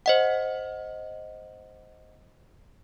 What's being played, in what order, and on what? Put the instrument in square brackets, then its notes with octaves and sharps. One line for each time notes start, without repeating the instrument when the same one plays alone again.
[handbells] C5 D#5 F#5